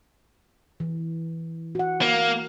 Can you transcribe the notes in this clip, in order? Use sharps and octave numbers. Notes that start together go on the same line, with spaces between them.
E3
F#4 F#5
A#3